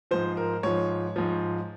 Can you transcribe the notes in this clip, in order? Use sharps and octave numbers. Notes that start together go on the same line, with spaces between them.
G#2 F3 C5
A#4
G#2 F3 C#5
G#2 F3